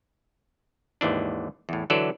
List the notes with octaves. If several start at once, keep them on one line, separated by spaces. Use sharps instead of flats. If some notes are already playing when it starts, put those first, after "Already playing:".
G#1 D#2 E3 D4
E2 A2
D3 E3 F#3 A4 D5